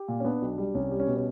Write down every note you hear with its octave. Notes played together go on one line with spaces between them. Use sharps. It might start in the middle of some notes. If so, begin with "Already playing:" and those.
Already playing: G4
A#2
C#4
B3 D4
B1
G3
C2 C#4
G3
C#4
B2
C#4